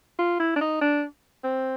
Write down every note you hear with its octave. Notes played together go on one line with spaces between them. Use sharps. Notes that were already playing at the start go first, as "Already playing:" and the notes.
F4
E4
D4
D#4
D4
C4